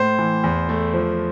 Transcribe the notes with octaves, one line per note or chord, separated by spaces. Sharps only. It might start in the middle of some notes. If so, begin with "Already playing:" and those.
Already playing: A2 C5
E3
E2
A3
F3